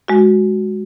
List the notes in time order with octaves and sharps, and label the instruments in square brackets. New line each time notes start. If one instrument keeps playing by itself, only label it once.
[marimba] G#3 F#4